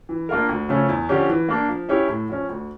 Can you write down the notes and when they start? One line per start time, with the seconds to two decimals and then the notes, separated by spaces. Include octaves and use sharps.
0.09 E3
0.29 A#3 D4 F4 A#4
0.49 D2
0.69 C#3 F3 A3 C#4
0.89 E2
1.09 D3 F3 C#4 G4
1.29 E3
1.49 A#3 D4
1.69 F3
1.89 C#4 E4 G4 C#5
2.08 A2
2.29 F3 C#4
2.49 D2